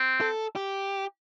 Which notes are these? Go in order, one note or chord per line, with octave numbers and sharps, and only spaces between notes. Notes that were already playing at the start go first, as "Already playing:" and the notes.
Already playing: C4
A4
G4